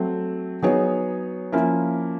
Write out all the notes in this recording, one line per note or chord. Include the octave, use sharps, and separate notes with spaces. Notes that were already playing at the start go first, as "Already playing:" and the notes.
Already playing: F#3 A3 C4
F#3 B3 D#4 G#4 C#5
F3 A#3 C#4 E4